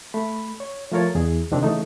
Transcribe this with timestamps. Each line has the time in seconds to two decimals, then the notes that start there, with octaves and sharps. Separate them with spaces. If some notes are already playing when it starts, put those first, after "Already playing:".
0.14 A3 B5
0.60 C#5
0.92 F3 A3 F4 A#4 C#5 A6
1.15 E2 G#4
1.51 D2 C3 D#3 C4 D4
1.63 C#3 E3 A3 D#4